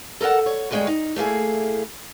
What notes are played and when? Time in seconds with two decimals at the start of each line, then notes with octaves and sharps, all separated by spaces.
0.21 A4 A#4 D#5 F#5 A5
0.46 C#5
0.71 D2 G2 G#3 C#4 C#5 G5
0.87 D#4
1.16 A3 A#3 E4 G#4